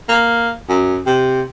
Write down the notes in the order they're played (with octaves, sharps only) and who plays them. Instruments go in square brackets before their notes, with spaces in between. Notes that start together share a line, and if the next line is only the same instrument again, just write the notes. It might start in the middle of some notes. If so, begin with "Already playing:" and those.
[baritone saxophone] A#3
F#2
C3